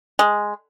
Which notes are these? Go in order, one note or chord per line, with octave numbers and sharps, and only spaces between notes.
G#3